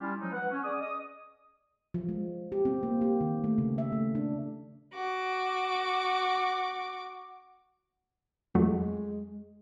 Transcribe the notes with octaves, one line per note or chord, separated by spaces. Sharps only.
G3 C#4 E4 F4 G4
F3 F#3 G#3 D#4
B4 F#5
C#4
G#4 D5 D#6
D#5 D#6
F3
G#3
G4
C4
A#3
G4
D#3
A3
C#3
E5
A3
D4
F#4 D6
F2 F#3 G#3 A3